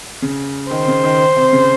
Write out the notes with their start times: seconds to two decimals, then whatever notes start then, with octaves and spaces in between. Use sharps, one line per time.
0.22 C#3
0.71 D#3 C5
0.88 C#3
1.04 D#3
1.36 C3
1.53 C#3